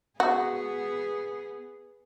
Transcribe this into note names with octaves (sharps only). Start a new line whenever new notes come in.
B3 F#4 G#4